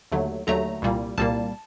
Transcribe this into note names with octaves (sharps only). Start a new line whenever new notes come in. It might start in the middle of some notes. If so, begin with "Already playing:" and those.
D#2 D3 F#3 A3
D#2 D3 F#3 A3 A#5
C2 A#2 G3 A#3
C2 A#2 G3 A#3 A5